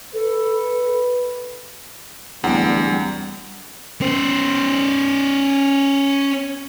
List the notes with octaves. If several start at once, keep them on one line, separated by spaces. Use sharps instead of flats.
A4 B4
D1 E2 G3 F#5 G5 D7
C#4 C5